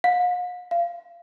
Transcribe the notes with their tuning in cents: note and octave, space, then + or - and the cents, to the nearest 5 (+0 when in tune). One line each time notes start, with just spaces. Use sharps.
F5 +45
F5 -25